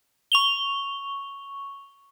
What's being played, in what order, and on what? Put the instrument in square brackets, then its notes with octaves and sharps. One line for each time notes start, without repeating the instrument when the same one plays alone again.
[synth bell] C#6 F7 G7